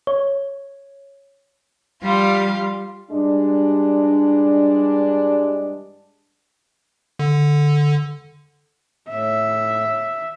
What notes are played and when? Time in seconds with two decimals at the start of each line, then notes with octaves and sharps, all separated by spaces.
0.07 C#5
2.03 G3 F4 F5
3.11 G2 E3 G3 G#3 D4
7.19 D3
9.09 A2 E5